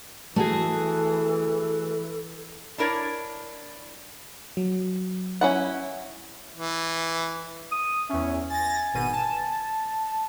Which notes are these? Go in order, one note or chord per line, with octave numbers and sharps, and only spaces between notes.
E3 A3 F#4 G#4 A4
D4 E4 A#4 C#5 D5
F#3
C#4 E4 F#5
E3
D#6
E2 C#4 E5
G#5 A6 A#6
G#1 B2 D#7
A5